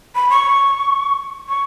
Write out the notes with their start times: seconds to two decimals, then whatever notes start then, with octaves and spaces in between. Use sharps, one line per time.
0.15 B5
0.30 C#6
1.49 C#6